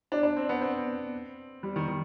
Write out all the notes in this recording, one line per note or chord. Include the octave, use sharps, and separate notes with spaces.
D4
D4
C4
B3
C4
G3
D#3
D#3